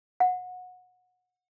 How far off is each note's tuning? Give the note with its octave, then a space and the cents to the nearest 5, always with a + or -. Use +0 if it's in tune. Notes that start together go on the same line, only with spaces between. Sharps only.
F#5 -25